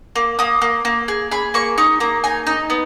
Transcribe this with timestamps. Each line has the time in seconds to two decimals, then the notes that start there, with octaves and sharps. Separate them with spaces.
0.16 A#3
0.39 A#3 D#6
0.62 A#3
0.85 A#3
1.08 G#4
1.31 G#4 B5
1.54 A#3 C#6
1.78 D#4 C#6
2.00 A#3 A#5
2.24 D#4 G#5
2.46 D#4 D#5
2.70 B3